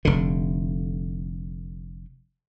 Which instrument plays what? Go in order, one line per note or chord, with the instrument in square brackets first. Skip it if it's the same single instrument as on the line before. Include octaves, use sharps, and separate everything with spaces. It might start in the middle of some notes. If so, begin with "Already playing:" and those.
[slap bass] F1 D3